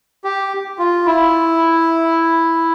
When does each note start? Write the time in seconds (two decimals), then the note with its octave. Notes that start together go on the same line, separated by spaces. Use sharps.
0.24 G4
0.79 F4
1.06 E4